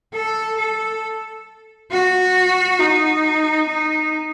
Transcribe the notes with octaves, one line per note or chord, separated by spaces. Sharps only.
A4
A4
F#4
D#4
D#4